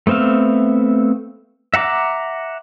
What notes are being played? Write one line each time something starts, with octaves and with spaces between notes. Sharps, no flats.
A3 B3 C4 E5 F5
E5 F#5 A#5 D6